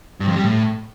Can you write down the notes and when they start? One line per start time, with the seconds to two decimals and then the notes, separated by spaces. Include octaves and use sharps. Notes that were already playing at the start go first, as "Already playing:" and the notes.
0.20 G2
0.28 F2
0.36 G3
0.43 A2